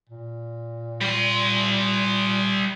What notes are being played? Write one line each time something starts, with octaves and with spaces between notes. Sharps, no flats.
A#2
G3 C6